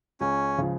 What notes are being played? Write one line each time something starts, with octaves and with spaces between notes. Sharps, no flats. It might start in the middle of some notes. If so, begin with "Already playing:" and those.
C#2 C#4
C#3 F3